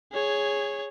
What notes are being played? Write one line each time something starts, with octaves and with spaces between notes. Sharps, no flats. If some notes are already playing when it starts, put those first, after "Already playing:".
G#4 C#5